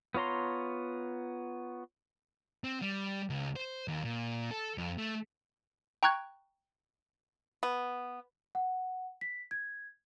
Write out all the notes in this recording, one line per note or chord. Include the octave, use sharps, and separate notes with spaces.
B3 F4 C#5 A#5 C6
C4
G3
C#2
C5
D#2
A#2
A4
F2
A3
G5 A#5 C#6 F#6 G#6
B3
F#5
B6
G#6